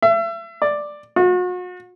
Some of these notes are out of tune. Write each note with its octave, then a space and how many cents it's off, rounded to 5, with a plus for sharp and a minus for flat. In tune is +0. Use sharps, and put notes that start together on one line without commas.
E5 +35
D5 +5
F#4 -40